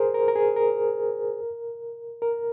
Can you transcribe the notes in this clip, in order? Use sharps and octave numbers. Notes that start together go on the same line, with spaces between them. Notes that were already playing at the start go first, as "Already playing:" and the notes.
Already playing: G#4 A#4 C5
A#4
A#4
G#4
A#4
A#4